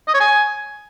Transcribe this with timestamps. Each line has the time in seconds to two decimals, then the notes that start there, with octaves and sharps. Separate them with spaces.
0.08 D#5
0.14 C#5
0.20 G#5